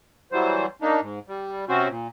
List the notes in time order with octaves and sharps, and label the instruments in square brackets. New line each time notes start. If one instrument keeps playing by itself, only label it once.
[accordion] E3 F#3 G3 C5
A#3 D4 D#4
G#2
G3
C3 C4 C#4 F#4 C5
A#2